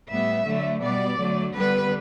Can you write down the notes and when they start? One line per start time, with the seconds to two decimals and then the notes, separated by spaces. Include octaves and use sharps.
0.11 A2 G3 B3 E5
0.48 D3 F#3 A3
0.83 B2 G3 B3 D5
1.19 D3 F#3 A3
1.55 D3 G3 B3 B4